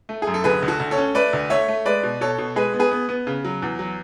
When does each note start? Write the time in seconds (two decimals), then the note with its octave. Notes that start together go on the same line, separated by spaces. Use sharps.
0.09 A3
0.22 G#4
0.27 F#2
0.34 A4
0.44 D2 G#4 B4
0.62 D2
0.68 F#4 A4
0.80 D2
0.91 A4 C#5
0.98 C#4
1.15 A3 B4 D5
1.33 D2
1.50 A3 C#5 E5
1.68 A3
1.85 G#3 B4 D5
2.03 B2
2.21 B2 A4 C#5
2.38 B2
2.56 G#3 G#4 B4
2.74 B3
2.79 G#4 B4
2.91 B3
3.09 B3
3.27 C#3
3.45 F#3
3.62 E2
3.79 F#3